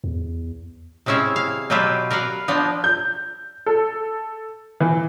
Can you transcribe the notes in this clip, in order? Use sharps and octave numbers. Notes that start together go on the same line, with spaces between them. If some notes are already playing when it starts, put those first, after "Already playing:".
E2
C3 G#3 C#4 E4 E5 F5
F5
B2 F#3 F4 G4 B4 E5
A#4 B4 D5 F5 F#5
F3 B3 D4 D#5
G6
A4
E3